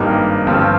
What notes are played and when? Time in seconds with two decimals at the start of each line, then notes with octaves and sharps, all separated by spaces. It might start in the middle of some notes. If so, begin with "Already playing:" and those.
Already playing: G#1 G2 G3 A#3 D#4
0.47 G1 G2 F3 C4